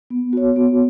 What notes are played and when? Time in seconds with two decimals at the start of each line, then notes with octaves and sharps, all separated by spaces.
0.10 B3
0.33 F#4 C#5
0.56 B3